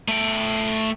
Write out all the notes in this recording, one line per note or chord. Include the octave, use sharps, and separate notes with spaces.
A3 G5